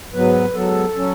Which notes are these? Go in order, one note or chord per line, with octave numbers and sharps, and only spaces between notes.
G#2 F#3 B3 B4
G#2 F#3 B3 A4
F#3 C#4